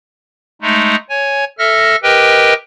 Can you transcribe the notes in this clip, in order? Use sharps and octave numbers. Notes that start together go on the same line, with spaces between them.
G#3 A3 D#4
C#5 G#5
A4 E5 F6 A#6
G4 A#4 B4 D#5 G5